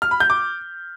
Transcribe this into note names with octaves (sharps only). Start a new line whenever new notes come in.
F6
B5
G6
D6